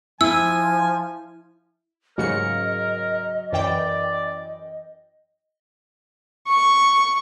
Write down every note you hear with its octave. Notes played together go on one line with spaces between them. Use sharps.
F3 E4 G#5 E6
G#2 C#3 F#3 A#4 D#5 C#7
F#2 E3 D5 G5
C#6